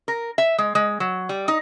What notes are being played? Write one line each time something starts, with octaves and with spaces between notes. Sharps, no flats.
A#4
E5
G#3
G#3
F#3
G3
D#4